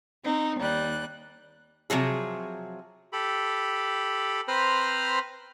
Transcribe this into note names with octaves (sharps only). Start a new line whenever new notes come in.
C4 D#4
D#2 G3 F#6
C3 F3 F#3 G#4
G4 A4 B5
C4 B4 C5 A#5 B5 F6